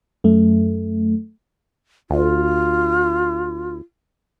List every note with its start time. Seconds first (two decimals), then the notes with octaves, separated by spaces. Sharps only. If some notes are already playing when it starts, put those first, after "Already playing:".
0.24 F#2 A3
2.10 D2 F4